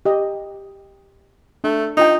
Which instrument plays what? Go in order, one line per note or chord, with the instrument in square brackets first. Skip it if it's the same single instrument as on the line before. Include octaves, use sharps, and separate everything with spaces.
[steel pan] G4 D#5
[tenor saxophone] A3 [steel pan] D4
[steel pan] D4 F4 G5 [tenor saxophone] D#4